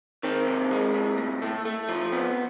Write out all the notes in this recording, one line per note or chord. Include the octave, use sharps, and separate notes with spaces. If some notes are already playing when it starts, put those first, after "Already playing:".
D#3 C4
C3
G#3
C3
A2
A3
A3
F3
B3 C4